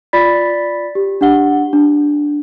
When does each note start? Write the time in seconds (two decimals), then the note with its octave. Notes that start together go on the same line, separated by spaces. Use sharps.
0.13 F4 D5 B5 A6 B6
0.95 G4
1.21 D4 G4 F#5 G7
1.73 D4